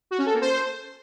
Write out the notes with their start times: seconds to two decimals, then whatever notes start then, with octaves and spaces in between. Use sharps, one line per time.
0.11 F#4
0.18 C#4
0.26 A4
0.34 A#3
0.41 C5